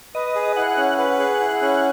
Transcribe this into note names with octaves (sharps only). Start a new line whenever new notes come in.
B4 D#5
G#4
E4 F#5
C#4
B4 F#5
G#4
E4
C#4